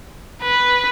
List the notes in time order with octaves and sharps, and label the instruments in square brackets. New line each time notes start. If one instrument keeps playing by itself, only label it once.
[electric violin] B4